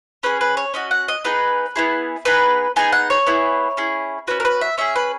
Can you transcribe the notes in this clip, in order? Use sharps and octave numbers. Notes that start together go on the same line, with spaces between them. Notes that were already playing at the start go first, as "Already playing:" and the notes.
C#4 G#4 B4
B4
C#5
C#4 F#4 D#5
F#5
D#5
B3 D#4 G#4 B4
B3 E4 G#4
B3 D#4 G#4 B4
B3 D#4 G#4 G#5
F#5
C#5
B3 E4 G#4
C#4 E4 G#4
C#4 F#4 B4
A#4
B4
E5
C#4 G#4 E5
B4